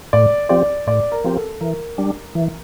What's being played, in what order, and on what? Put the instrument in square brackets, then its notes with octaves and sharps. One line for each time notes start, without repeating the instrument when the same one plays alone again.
[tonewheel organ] A2 [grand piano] D5
[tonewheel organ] F3 C4 G4 [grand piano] D5
[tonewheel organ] A2 [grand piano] D5
[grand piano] A#4
[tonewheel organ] F3 C4 G4
[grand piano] A4
[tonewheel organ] E3 [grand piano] A#4
[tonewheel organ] G3 D4
E3